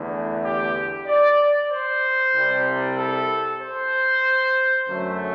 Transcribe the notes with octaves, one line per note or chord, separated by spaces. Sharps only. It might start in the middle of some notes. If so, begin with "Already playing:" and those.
Already playing: E2 D3 A3
G4
D5
C5
C2 C3 G3
A4
C5
F#2 D3 F#3 A3